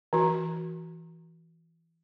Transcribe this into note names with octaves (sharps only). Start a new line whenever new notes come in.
E3 F#4